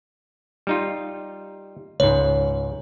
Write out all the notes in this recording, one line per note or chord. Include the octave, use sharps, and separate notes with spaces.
G3 D#4 F4
C#2 G#2 C#5